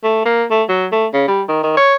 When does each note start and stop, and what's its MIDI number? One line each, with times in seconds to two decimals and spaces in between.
0.03 0.24 57
0.25 0.44 58
0.50 0.63 57
0.69 0.87 54
0.92 1.07 57
1.13 1.27 49
1.28 1.42 55
1.48 1.61 51
1.63 1.74 51
1.77 1.96 73